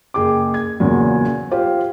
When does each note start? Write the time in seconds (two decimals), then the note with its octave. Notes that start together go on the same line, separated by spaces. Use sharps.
0.14 F#1 G#4 G5 D6
0.54 G#6
0.80 E2 A#2 C#3 F#3
1.51 F4 G4 C5 F5